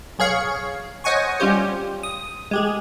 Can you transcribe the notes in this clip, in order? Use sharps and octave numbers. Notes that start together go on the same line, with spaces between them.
B1 G#4 C#5 F5 C#7
C5 C#5 D#5 F#5 G#5 C#6
G3 C#4 F4 G4 C5
D#6
G#3 G4 G#4